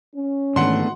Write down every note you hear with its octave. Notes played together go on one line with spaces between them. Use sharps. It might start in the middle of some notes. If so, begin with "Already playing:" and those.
C#4
G#2 D#3 E3 A3 B3 D4 F#5 C6